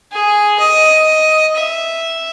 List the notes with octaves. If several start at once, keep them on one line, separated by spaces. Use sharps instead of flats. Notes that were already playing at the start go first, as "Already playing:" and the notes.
G#4
D#5
E5